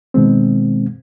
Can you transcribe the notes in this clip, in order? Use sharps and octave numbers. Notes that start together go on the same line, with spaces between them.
B2 D#3 G#3 C4